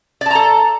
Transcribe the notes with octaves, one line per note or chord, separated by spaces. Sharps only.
A4 D5 A5 A#5